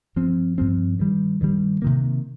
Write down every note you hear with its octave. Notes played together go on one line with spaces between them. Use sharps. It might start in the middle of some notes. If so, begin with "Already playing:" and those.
G2 F3 C4
G2 F3 C4
G2 D#3 G3
G2 D#3 G3
C3 D#3 A#3